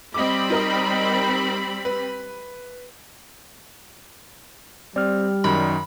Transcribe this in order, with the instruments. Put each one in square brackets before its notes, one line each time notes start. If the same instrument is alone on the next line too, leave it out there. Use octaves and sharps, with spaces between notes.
[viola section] G3 C4 B5 [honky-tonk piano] D#5 D6
[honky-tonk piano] D#4 A#4 D#5
B4
[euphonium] G3 [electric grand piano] C4 [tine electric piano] D5 F6
[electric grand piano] F#2 D#3 [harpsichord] B5